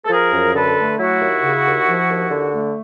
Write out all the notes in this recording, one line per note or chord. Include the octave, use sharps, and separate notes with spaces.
A4
F3 G#4 A#4
F#2
D3 A4 B4
A3
F#3 E4 F#4
D#2
C#3
D#2
F3
D#2
D3
A3